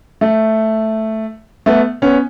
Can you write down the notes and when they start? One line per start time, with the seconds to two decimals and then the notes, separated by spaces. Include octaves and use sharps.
0.21 A3
1.66 A3 B3
2.02 B3 C#4